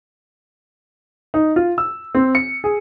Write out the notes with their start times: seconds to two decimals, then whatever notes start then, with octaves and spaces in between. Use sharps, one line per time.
1.34 D#4
1.56 F4
1.78 E6
2.15 C4
2.35 C#7
2.64 G#4